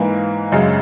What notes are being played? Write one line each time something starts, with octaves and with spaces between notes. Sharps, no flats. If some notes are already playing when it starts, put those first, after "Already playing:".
Already playing: G#2 E3 A#3
F#2 C#3 G#3